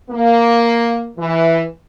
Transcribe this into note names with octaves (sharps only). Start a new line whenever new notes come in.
A#3
E3